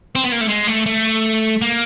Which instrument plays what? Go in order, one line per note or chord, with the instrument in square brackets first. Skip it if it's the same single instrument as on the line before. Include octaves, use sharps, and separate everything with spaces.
[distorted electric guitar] C4
B3
A#3
A3
G#3
A3
A3
A#3